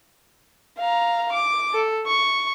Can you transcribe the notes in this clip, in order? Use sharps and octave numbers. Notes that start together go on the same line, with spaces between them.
F5 A#5
D6
A4
C#6